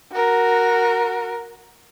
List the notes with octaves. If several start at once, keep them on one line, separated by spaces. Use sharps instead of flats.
F#4 A#4